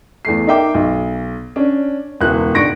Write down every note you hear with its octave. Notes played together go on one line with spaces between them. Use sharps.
E2 A3 C7
D#4 A#4 E5 G5 D6
B1
C#4 D4
E1 C#2 E3 F#6
C#2 G#2 D4 C#6 A#6 D7